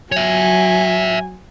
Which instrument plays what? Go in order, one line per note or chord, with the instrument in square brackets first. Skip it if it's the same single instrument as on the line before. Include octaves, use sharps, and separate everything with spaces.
[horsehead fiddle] F#3 G#5 [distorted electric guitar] C#5 E5